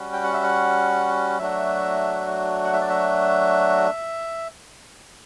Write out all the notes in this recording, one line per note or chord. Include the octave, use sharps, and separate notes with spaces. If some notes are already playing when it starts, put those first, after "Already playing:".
Already playing: G3 C#4 F#4
G5
F#5
E5
F#5
F#3 A3 D4 F#4 E5
F#5
E5
D5
E5